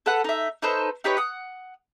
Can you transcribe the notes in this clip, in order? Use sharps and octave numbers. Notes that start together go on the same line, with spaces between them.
A4 B4 F#5
D#4 E5
D#4 A4 B4 C5
D#4 G4 B4 C#5
F#5 D#6